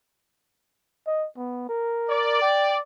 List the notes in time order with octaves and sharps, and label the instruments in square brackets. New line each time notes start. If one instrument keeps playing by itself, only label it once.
[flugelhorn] D#5
B3
A#4
[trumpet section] D5
[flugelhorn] G5